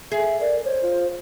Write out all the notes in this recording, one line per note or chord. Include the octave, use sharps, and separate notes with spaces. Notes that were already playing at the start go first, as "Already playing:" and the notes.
G#4 E5
A#4 D5
C5 C#5
F4